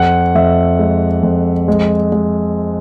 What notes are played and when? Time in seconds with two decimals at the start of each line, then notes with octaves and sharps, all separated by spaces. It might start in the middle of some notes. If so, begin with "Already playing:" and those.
Already playing: F2 F#5
0.35 F2 E5
0.79 G#3
1.23 F2
1.68 G#3
2.12 G#3